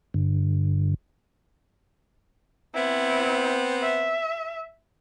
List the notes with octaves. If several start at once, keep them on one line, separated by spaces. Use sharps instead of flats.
G2 D3
B3 C4 E4
E5